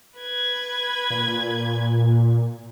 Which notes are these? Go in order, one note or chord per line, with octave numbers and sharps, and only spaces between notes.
B4 G#6
A#2